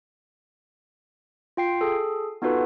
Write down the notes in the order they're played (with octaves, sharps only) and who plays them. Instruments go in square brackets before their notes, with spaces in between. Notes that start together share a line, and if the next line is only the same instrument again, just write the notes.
[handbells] F4 G5 C7
G#4 A4
B3 D#4 F4 F#4 A4 B4